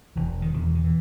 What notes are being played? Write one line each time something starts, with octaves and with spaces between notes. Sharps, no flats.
E1 E3
D#3
E2 B2
E3
D#3
E3